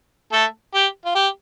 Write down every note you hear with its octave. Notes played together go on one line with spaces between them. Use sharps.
A3 A4
G4
F4
G4